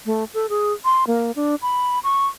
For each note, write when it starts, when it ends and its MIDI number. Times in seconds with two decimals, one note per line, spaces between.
0.06 0.24 57
0.34 0.47 69
0.49 0.73 68
0.85 1.07 84
1.07 1.32 58
1.36 1.55 62
1.62 1.99 83
2.04 2.27 85